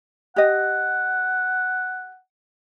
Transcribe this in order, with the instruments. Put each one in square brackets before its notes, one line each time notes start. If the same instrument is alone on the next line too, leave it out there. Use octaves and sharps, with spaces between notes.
[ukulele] G4 D#5 [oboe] F#5